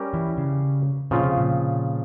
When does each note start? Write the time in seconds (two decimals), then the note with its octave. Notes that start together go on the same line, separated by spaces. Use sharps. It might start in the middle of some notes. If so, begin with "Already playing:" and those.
Already playing: G3 C#4 G4 A#4
0.14 E3
0.38 C#3
1.11 A#2 C#3 F3 C4 F4
1.23 C3
1.37 A#2